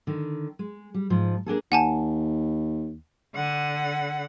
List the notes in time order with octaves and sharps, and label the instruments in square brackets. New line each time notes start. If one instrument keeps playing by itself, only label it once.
[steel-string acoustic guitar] D3 D#3
G#3
G3
G#2 F3
A#3 D4 G#4 A4
[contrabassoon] D#2 [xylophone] F#5 G#5 A5
[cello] D3 F#5